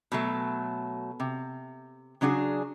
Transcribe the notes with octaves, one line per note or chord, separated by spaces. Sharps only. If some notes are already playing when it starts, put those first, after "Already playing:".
B2 F#3 A3
C3
C#3 F#3 D4 F#4 G#4